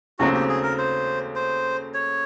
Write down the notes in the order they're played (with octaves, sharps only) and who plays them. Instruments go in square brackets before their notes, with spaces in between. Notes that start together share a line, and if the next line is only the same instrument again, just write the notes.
[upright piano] D#2 C#3 F#3 A3 C4 [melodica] F#4
[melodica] G4
G#4
A#4
C5
C5
C#5